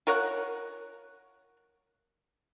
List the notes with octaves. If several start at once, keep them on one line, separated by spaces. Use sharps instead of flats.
F4 A#4 C#5 F#5